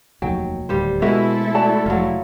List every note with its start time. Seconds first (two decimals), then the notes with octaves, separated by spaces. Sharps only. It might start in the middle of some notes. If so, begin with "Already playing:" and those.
0.22 F1 D#2 D#3 F#3 G5
0.69 D1 D#2 G3 A#3 C5
1.02 B2 G#3 A3 E4 F#4 A4 A#4 E5
1.55 F#4 D5 A5
1.86 F1 F#3 F4